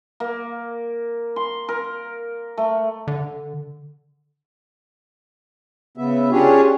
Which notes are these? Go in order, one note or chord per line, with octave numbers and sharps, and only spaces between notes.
A#3
C6
A#4
A3
D3
C#3 B3 E5
C#4 D4 F4 G4 G#4 C#5